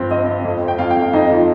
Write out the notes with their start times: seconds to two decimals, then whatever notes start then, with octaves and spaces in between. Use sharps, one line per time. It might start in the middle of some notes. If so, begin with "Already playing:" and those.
Already playing: G2 F3 C4
0.10 C4 D#5
0.27 C4
0.44 F2
0.62 C4
0.68 G5
0.78 F2 F5
0.90 G5
0.97 F2
1.02 F5
1.13 F2 D#4
1.30 F3